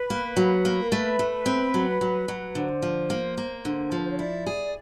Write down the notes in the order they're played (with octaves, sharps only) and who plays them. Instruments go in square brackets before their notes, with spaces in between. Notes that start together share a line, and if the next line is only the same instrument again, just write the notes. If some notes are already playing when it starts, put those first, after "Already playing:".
Already playing: [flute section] B4
[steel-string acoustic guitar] A#3
F#3
A#3
[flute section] A#4
[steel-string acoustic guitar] A3 [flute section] B4
[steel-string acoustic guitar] A3
C4
F#3
F#3
F#3
[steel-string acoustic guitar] D3 [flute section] C5
[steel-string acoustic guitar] F3
A#3
A#3
D3
F3
[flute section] B4
C5
C#5
[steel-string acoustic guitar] E4 [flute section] D5
[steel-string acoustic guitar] G#4